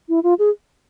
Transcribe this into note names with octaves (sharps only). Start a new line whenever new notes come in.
E4
F4
G#4